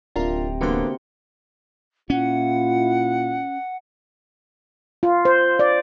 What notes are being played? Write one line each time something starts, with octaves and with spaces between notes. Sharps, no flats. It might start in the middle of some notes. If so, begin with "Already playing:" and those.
D1 C3 D4 F4 A#4 A#5
D3 A#3 B3 F#4 C5
A#2 C#4 E4 F4 F#5
F4
C5
D5